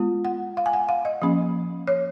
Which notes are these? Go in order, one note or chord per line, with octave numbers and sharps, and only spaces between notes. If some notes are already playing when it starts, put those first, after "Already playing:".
Already playing: G#3 B3 F4
F#5
F5
G#5
F#5
F5
D#5
F3 A#3 C#4
C#5